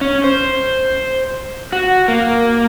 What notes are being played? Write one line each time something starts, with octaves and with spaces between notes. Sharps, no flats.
C#4
C5
F#4
A#3